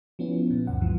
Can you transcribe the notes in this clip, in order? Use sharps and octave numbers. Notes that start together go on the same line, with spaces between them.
F3 B3 C#4 E4
A#2
C#2 F#2 F#5
G2 E3 F3